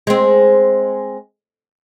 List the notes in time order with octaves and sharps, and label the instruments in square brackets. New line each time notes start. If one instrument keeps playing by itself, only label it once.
[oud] G#3 C4